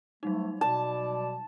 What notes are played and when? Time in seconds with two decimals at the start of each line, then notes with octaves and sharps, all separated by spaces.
0.23 F#3 G3 A3 D#4
0.61 B2 D5 A5